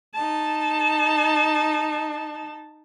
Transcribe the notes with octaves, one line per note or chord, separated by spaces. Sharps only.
D#4 A5